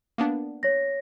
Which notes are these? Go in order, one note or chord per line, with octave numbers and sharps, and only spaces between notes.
A#3 B3 D4
C#5 A#6